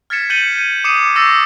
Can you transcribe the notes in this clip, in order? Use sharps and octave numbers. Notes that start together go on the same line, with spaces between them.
F6 G#6 A6 B6 C#7 E7
G6 C#7 D#7 F#7 G7
D#7
D6 D#6 C7 C#7 D#7 E7
C#6 D6 E6 A6 A#6 C7